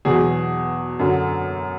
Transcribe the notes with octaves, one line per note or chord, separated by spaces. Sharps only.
E2 B2 F#3 G#4
F#2 D3 F#3